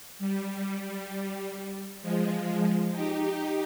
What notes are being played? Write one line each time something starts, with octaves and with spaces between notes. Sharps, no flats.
G3
F3 G#3
D#4 G4